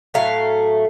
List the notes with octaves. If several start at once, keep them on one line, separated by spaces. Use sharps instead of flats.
A2 F#3 A3 F5